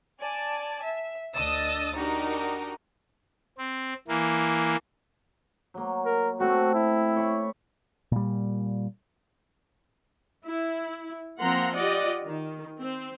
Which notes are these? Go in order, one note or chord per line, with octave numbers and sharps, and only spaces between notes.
D5 G#5 A5
E5
D2 D4 D#5 D#6 E6 A6
D4 D#4 F#4 G4 A#4
C4
E3 A#3
F#3 A#3
A#4
A3 C4 F#4
E4
C#5 D5 B5
A#2 G3
E4
F3 A#3 C4 F#5 A#5 C6
F4 G4 D5 D#5 F#5
D#3
C4